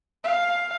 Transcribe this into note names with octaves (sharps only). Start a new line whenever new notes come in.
F5